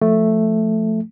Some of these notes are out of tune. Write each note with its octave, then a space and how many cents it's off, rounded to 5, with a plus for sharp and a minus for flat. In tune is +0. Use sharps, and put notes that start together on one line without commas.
F3 +0 A3 +0